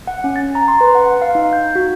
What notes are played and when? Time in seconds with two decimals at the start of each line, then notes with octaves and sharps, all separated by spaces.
0.07 F#5
0.24 C#4
0.36 A6
0.55 A#5
0.68 C6
0.81 B4
0.95 F#5
1.22 F5
1.35 D#4
1.53 G6
1.75 F#4